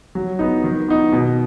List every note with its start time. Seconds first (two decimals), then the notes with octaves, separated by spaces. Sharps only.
0.15 F#3
0.39 B3 D#4
0.64 D#3
0.88 B3 D#4
1.13 B2